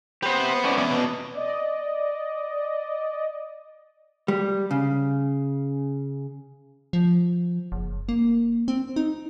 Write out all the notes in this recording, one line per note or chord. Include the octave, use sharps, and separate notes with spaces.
G4 B4 C5 F#5
A3 C#4 D5
E2 B3
B2
D5 D#5
G3
C#3
F3
F#1
A#3
C4
D#4